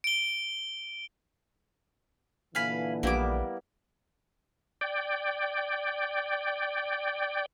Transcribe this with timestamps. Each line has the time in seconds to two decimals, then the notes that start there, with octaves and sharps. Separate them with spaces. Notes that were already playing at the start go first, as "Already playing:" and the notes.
0.04 D7 G7
2.55 A#2 D3 E3 F5 G#5 B5
3.03 A#1 G3 A#3 B3 E4 D6
4.81 D5 G5